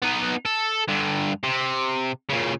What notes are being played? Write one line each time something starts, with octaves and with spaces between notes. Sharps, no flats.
B3 D#4
A4
G2 D3
C3
A#2 C#3